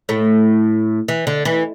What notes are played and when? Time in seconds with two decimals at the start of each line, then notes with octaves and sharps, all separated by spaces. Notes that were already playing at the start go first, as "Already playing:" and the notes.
0.09 A2 A3
1.08 E3
1.27 D3
1.45 E3